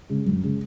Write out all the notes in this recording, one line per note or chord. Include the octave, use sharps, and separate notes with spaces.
C#3 G#3
F#2
C#3 G#3